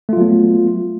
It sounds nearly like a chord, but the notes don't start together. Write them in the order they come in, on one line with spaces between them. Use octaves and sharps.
A3 F4 F#3 B3